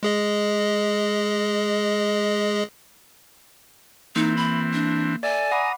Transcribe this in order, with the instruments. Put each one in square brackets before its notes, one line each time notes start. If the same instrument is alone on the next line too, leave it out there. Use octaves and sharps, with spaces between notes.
[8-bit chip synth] G#3 G#4 D#5
[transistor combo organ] E3 C4 [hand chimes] A#3 [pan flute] D#4
[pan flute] B5
D4
[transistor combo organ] A4 [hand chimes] D5 E5 [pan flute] G#5
[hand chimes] F#5 B5 D6 [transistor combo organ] A#5 D#6